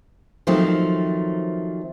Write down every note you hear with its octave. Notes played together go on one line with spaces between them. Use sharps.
D#3 F3 F#3 A3 C4